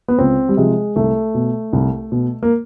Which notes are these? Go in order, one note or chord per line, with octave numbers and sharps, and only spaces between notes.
B3
C#2 C4
G3
C3 F3 G#3
C2 A3
B2
C2
B2
A#3